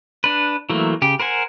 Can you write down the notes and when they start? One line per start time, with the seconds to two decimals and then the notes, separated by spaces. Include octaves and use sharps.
0.24 D4 B4
0.70 E3 F#3 A3 A#3
1.02 C#3 G4
1.19 A#4 C5 F#5 G#5